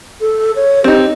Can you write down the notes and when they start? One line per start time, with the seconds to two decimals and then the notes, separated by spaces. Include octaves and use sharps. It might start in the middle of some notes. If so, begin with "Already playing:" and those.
0.21 A4
0.56 C#5
0.84 C4 D#4 G4